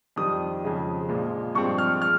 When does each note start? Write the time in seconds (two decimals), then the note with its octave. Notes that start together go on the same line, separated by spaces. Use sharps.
0.16 F2 D#3 G3 D#6
0.63 F2 C#3 G#3
1.09 A#1 A#2 F3 G#3
1.55 G2 F3 G#3 C4 C#6
1.78 F6
2.02 F6